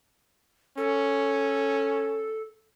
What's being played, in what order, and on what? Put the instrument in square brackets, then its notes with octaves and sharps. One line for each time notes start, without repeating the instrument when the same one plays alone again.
[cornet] C#4 [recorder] A4